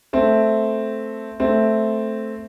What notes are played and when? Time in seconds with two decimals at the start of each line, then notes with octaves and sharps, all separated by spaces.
0.13 A3 C4
1.40 A3 C4